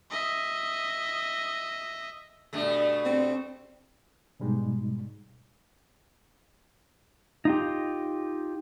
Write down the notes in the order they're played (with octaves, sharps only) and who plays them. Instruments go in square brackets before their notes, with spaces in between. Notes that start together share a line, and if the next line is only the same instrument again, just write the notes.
[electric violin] D#5 E5
[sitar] G2 B2 A3
[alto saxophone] C4
[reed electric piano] G#2 B2 G3 G#3 D#4
[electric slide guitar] D#4 F4 G4